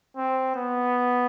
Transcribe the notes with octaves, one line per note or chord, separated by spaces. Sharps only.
C4
B3